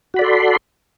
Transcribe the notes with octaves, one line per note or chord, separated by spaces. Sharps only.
F#4 A4 D5 B5 C6